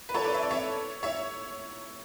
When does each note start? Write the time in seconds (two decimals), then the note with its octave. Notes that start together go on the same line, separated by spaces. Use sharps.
0.09 B4
0.14 A4 C#5
0.24 B4 D5
0.34 E5
0.43 D5
0.51 C#5 E5
1.03 C#5 E5